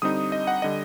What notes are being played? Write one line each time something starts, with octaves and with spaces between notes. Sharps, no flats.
D3 G3 C4 D#4 D#6
D#5
F#5
D3 G3 D#5